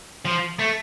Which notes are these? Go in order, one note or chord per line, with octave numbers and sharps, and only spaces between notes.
F3
A3